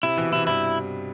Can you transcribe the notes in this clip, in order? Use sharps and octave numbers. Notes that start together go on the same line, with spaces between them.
C3 E4
B2 E3
C3 E4
G2 E4